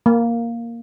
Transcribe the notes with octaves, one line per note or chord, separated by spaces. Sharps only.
A#3